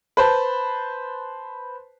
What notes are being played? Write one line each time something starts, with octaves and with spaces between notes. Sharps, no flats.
B4 C5 A5